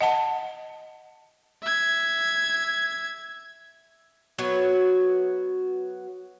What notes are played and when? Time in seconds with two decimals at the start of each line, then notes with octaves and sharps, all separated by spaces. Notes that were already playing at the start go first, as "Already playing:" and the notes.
0.01 D#5 F#5 A5
1.63 E5 G#6
4.38 F#3 B3 F#4 C#5